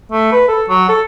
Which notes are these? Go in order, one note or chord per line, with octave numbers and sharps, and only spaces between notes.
A3
B4
A4
F#3
A4